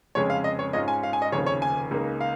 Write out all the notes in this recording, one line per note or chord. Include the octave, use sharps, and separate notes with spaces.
F1 F2 C#3 G#3 C#4 C#5
F5
D#5
C#5
G#2 G#3 C#4 F4 D#5
G#5
F5
G#5
D#5
F1 D#2 C#3 F3 C#5
C#5
G#5
C#2 C#3 A#3 D#4
F5